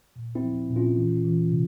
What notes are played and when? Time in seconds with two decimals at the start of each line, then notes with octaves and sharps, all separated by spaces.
0.16 A#2
0.35 C4 E4
0.43 F3
0.70 A#2
0.76 C#4 F4
0.97 E3
1.24 E3
1.51 C3